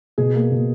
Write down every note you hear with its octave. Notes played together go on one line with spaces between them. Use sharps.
B2 G#4
A#3
B2